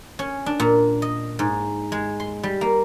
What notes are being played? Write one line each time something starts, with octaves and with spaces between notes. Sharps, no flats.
C#4
D4
A#2
D#5
G#2
G#3
C6
G3
A#3